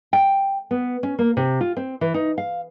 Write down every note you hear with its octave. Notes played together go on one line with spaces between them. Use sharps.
G5
B3
C#4
A#3
C3
F4
C4
E3
D#4
F5